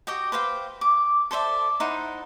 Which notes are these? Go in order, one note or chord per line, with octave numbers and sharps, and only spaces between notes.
F#4 G4 D#5 G5
B4 C5 F5 G5
D6
A4 C5 D5 E5
D#4 E4 C5 F#5